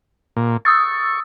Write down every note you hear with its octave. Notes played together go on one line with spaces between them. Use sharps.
A#2
C#6 D#6 E6 A6